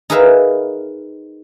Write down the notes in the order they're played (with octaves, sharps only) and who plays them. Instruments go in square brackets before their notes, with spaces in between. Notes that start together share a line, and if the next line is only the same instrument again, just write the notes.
[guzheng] D#4 G#4 A#4 B4 E5 F5